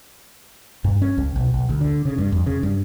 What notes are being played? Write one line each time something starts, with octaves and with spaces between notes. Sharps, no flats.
G2
C#4
C#2
B1
B1
D2
D3
C#3
G2
F2
C#3
G2